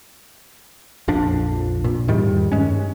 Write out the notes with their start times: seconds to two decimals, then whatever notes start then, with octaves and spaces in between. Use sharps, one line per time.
1.08 A#1 F2 F3 D4
1.84 A#2
2.08 E2 G#2 D#3 G3
2.52 G2 G#3 C#4